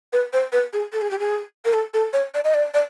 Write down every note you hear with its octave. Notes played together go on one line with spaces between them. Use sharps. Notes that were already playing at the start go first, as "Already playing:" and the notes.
B4
C5
B4
G#4
A4
G#4
G4
G#4
A#4
A4
A4
C#5
D5
D#5
D5
D5